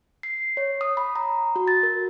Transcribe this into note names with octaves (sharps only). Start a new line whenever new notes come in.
C7
C#5
D#6
B5
A#5
F#4
A6
A#4